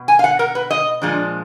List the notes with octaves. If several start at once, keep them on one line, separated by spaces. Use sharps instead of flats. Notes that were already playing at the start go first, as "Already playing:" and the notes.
Already playing: B2
G#5
F5
F#5
A#4
B4
D#5
A#2 F3 G#3 D4